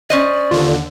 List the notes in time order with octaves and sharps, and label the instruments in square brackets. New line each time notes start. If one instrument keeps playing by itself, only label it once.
[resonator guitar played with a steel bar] C#4 C5 D#5 [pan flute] D5
[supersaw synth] D#2 D3 [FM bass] F4